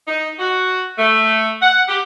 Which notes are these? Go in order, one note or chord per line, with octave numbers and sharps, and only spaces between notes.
D#4
F#4
A3
F#5
G4